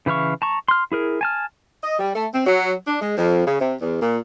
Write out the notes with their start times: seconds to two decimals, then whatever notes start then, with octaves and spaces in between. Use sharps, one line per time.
0.06 C#3 E3 E4 F5 C#6
0.42 A5 A#5 C#6
0.68 C6 F6
0.92 E4 G#4 A#4
1.21 G#5 A5 F6
1.83 D#5
1.99 G3
2.14 A3
2.33 C4
2.47 F#3
2.86 D4
3.02 G#3
3.18 F2
3.47 C#3
3.61 C3
3.80 E2
4.02 A#2